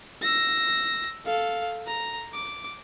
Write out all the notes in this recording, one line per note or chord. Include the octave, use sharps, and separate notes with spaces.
E6 A#6
A4 F5
A#5
D6